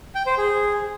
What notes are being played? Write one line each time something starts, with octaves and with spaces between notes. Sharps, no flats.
G5
C5
G#4